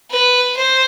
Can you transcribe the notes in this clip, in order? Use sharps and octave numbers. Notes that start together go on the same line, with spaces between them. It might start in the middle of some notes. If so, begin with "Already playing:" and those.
B4
C5